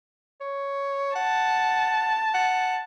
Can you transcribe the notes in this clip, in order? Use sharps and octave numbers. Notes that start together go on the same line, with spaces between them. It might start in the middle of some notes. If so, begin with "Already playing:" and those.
C#5
F#5 A5
F#5